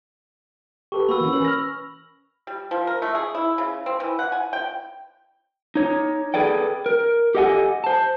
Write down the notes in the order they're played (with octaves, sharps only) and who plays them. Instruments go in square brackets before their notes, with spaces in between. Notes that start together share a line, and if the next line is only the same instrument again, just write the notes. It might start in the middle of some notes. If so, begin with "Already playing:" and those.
[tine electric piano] G4 A4 B4 [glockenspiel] C#6
[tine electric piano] A#3 F#4 B4 [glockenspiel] B5 C#6 E6
[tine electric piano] E3 C#4
[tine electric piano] C#4 A#4 B4 [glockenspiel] F#7
[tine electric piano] F6 A#6
[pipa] G3
F3
A#4
A3
G#4
E4
C#3
C4
E3
F#5
G#5
G5
[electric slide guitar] D#4 C#5
G#4 A4 B4 D5 G5
A#4
G4 A4 D#5 F#5 G#5
C5 A5